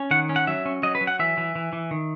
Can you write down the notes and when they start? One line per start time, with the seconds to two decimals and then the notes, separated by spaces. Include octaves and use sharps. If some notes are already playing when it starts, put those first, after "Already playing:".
Already playing: C#4
0.11 D#3 F#5
0.29 C#4
0.36 F#5
0.47 F#3 E5
0.65 C#4
0.83 F#3 D#5
0.95 B4
1.01 F#3
1.07 F#5
1.19 E3 E5
1.37 E3
1.56 E3
1.73 E3
1.91 D#3